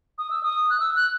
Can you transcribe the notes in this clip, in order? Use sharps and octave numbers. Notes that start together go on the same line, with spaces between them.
D#6
E6
D#6
F#6
E6
F#6